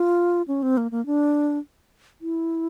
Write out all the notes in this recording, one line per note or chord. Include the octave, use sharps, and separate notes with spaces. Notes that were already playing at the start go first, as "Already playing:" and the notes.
Already playing: F4
C#4
C4
A#3
A#3
D4
E4